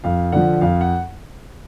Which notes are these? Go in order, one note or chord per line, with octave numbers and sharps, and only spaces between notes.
F2 F5
D3 F3 F#5
F2 F5
F#5